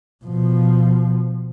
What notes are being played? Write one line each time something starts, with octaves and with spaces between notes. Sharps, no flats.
B2 F3